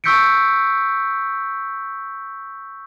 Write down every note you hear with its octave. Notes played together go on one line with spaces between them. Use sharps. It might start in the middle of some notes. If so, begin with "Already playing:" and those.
C#6 E6 G6 B6 C#7 D7